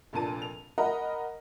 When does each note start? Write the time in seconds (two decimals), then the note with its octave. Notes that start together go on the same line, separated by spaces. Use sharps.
0.13 F1 A#2 D4 A5 D#7
0.42 F7
0.78 A#4 D#5 F#5 A#5 B5